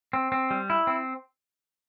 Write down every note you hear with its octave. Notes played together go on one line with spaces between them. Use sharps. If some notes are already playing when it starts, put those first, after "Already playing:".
C4
C4
G3
E4
C4